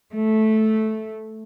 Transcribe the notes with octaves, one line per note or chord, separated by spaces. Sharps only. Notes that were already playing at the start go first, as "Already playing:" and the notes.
A3